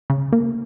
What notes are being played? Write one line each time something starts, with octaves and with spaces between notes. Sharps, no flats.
C#3
A#3